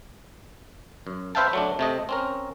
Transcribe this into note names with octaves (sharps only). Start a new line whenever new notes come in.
F#2
B4 C5 E5 F5 G5 A5
F#3 A3 D4
C3 A3 D#5
C4 C#4 A#4